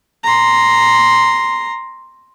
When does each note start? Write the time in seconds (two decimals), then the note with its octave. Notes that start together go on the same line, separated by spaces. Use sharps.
0.24 A#5 C6